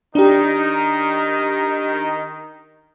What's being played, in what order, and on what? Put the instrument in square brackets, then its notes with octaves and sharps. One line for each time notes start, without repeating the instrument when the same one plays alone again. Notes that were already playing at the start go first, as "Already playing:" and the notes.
[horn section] D#3 D#4 [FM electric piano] D4 G4